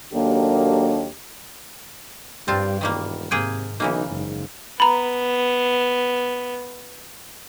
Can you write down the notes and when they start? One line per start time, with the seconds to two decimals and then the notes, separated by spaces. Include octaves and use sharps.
0.13 D#2 F#3 A#3 D4 G4 A4
2.48 G2 G3 C4 F4 A5
2.81 E1 D#3 G3 A#3
3.31 G#2 C3 A#3 G#4 G5
3.80 B1 C#3 E3 A#3 D#4
4.11 F#1 G#2
4.80 B3 A#5 B5